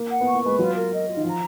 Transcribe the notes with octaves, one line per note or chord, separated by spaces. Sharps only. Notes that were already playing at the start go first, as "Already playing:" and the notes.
Already playing: A#3
F#5
B3 C#6
A#3
G#3 B4
F#3 F4
A#4
D#5
F4
D#3
F3 A#5